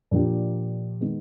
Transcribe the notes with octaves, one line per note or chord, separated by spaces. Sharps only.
A#2 F3 A#3 D4 G4
D#3 G#3 B3